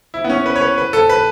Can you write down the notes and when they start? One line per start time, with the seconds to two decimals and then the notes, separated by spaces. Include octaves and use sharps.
0.14 E4
0.24 B3
0.30 C#4
0.46 B4
0.56 C#5
0.61 B4
0.78 B4
0.93 A4
1.09 B4